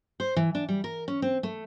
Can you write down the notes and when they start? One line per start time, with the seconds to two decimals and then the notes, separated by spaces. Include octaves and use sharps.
0.20 C5
0.36 E3
0.55 D4
0.69 G3
0.84 A#4
1.08 C#4
1.22 C4
1.43 A3